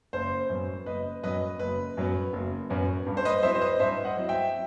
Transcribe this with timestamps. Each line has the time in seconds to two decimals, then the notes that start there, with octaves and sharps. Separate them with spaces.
0.13 F#1 C5
0.49 F#2 F#3 B3
0.86 F#1 B4 D#5
1.23 F#2 F#3 B3 B4 D#5
1.59 F#1 B4
1.97 F#2 F#3 B3
2.33 F#1
2.70 F#2 F#3 B3
3.06 G2
3.17 C5
3.25 B4 D#5
3.43 F#3 C4 E4 C5 E5
3.55 C5
3.61 B4 D#5
3.80 G2 C5 E5
4.05 D#5 F#5
4.17 F#3 C4 E4
4.29 E5 G5